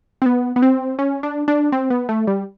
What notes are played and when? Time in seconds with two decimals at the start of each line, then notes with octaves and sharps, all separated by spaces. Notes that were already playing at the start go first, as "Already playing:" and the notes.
0.22 C4
0.26 B3
0.56 B3
0.62 C4
0.99 C#4
1.23 D4
1.48 D4
1.72 C4
1.90 B3
2.09 A3
2.27 G3